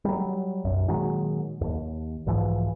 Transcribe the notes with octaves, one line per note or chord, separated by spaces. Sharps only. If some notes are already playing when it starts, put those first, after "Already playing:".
F#3 G3
B1 F#2
A#2 D#3 F#3 G#3
D#2
B1 G#2 E3 F3